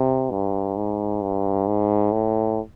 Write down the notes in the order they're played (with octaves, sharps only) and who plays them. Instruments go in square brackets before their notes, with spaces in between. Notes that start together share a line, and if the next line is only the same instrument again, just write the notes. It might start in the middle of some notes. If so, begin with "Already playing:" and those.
Already playing: [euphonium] C3
G2
G#2
G2
G#2
A2